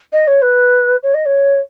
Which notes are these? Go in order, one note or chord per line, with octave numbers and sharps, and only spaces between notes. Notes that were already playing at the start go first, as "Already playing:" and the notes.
D#5
C#5
B4
C#5
D#5
C#5